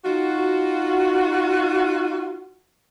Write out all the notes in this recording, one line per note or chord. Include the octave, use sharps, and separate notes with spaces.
D#4 F4 F#4